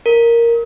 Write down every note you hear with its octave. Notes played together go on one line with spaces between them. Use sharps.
A#4